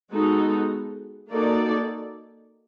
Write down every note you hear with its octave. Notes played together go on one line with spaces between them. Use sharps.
G#3 B3 D#4 F#4 A4
A#3 D#4 F#4 A4 D5